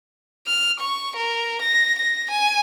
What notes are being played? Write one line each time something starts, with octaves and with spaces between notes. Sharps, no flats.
F6
C#6
A#4
A#6
A#6
G#5